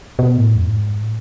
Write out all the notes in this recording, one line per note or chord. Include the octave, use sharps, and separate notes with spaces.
B2
A2
F2
A2
G#2
A2